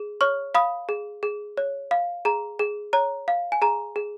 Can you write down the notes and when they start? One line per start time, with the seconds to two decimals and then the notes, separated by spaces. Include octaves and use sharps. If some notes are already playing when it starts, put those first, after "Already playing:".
Already playing: G#4
0.21 C#5 C#6 F6
0.55 F5 B5 D#6
0.89 G#4
1.23 G#4
1.57 C#5
1.91 F5
2.25 G#4 A#5
2.59 G#4
2.93 C#5 A#5
3.28 F5
3.52 G#5
3.62 G#4 A#5
3.96 G#4